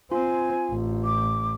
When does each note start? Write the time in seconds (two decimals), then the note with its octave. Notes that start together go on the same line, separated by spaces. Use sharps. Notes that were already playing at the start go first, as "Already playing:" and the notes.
0.12 C4 F4 G#5
0.71 A1
1.04 D6